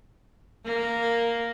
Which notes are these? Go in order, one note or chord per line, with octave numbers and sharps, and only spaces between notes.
A#3